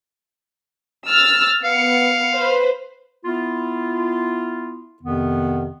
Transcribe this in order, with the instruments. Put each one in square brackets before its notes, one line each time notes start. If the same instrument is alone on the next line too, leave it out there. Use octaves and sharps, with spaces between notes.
[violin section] E6 F6 A6
[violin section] B3 C#7 [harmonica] F5
[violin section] B4 C5
[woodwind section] B3 E4 F4
F2 C3 D#3 B3